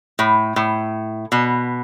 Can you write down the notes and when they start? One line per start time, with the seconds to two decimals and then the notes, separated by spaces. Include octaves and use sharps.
0.19 A2
0.56 A2
1.32 B2